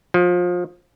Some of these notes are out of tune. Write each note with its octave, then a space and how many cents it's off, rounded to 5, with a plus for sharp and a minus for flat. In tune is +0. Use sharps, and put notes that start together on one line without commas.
F3 +25